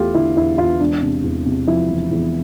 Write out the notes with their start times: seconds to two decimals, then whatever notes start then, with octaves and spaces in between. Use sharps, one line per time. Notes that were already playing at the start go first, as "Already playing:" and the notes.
Already playing: E2 A3 F4 G4
0.15 D3 E4
0.36 E2 E4
0.58 E2 F4
0.80 E1 D4
1.02 C3
1.24 E2
1.46 C3
1.67 F3 E4
1.89 E1
2.11 E2